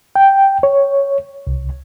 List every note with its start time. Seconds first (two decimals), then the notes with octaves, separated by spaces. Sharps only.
0.16 G5
0.63 C#5
1.47 C2